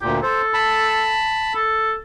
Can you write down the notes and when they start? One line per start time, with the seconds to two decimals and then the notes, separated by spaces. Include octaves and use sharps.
0.02 D2 A#2 G4
0.23 A4 C5
0.54 A5 B5
1.55 A4